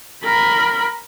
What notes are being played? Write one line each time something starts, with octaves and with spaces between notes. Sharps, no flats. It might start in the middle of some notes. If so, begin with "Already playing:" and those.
A#4 B5